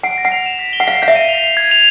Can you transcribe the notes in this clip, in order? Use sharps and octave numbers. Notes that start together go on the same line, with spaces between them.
F#5 D7
A#6
F#5
F7
E7
B6
G7
F#5
F5 C7
F5 G6
E5
D#7
F7
C7
G#6
F7